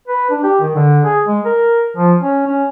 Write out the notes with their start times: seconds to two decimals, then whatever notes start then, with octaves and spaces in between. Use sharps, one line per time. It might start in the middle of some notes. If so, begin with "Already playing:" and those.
0.08 B4
0.31 D4
0.44 G4
0.60 D#3
0.75 D3
1.05 G#4
1.27 G#3
1.45 A#4
1.97 F3
2.21 C#4
2.47 C#4